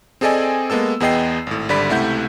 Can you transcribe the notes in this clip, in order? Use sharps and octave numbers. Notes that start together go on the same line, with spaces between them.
C4 G#4 A4 D5 D#5 G#5
G#3 A#3 B3 A4 E6
E2 B3 G#4 D#5 G5 C7
G#1 A2
G#1 D3 G3 D5 B5 B6
C#2 C3 A3 E4 F#5 G6